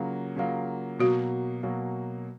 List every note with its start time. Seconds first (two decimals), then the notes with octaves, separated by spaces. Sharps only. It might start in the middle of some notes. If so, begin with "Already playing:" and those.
Already playing: C#3 F#3 A#3 F4
0.36 C#3 F#3 A#3 F4
0.99 B2 F#3 A#3 F#4
1.63 B2 F#3 A#3